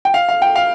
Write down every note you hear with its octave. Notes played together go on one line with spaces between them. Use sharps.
G5
F5
F5
G5
F5